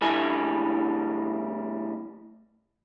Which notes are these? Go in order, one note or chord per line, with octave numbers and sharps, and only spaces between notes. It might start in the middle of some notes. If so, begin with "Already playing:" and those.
D2 A2 G3 E4 G#5